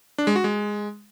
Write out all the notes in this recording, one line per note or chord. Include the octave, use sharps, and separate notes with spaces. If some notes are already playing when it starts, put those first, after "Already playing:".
D4
G#3
F#4
G#3